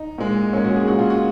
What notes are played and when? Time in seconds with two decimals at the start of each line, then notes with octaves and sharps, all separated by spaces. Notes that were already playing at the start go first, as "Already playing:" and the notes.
Already playing: D#4
0.18 A#2 G#3
0.53 A#2 C#4
0.57 G#3
0.64 F#4
0.76 G#4
0.88 A#2 G#3 F#4
0.99 F4
1.10 F#4